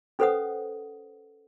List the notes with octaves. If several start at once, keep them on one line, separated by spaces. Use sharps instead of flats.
C#4 A4 B4 C5 F#5 D#6